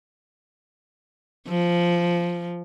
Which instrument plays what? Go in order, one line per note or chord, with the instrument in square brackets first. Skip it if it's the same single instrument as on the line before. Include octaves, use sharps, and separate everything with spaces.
[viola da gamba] F3